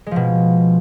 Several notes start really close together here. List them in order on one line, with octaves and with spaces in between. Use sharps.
G#3 F3 B2